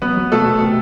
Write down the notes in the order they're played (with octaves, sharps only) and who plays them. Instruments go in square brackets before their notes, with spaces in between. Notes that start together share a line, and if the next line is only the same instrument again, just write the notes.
[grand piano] F#3 B3 B4
F#3
B2 A3 A4
B2
C3